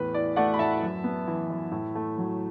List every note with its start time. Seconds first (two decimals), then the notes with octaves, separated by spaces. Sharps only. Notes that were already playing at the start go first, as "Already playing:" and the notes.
Already playing: E2 A2 B4
0.15 E4 D5
0.36 A3 D5 F#5
0.54 B5
0.59 A2 E5 A5
0.82 F#2
1.04 B3
1.28 E3
1.50 F#2
1.72 A2
1.95 A3
2.18 F#3